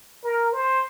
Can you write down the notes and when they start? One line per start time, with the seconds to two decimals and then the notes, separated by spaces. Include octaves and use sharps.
0.23 A#4
0.53 C5